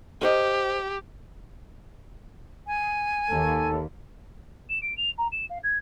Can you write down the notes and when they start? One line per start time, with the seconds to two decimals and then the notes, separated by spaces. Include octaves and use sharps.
0.21 G4 A#4 C5 D#5
2.67 G#5
3.31 D#2 A4
4.70 E7
4.82 D7
4.98 F7
5.18 A#5
5.32 E7
5.50 F5
5.64 G#6